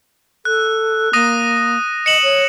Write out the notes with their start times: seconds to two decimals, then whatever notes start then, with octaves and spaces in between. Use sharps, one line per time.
0.45 A4 F#6
1.13 A#3 D#6 A#6 D#7
2.06 D#5 C#7 E7 F#7
2.23 C#5